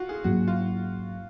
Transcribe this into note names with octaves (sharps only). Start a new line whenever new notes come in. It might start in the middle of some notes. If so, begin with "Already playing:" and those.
Already playing: F4 F#4
G#4
G#2 F#3 A#3 C#4 F#4
F4